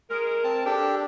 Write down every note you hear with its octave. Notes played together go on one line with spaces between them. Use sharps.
G#3 A#4
C4 A5
D4 G4 A4 G5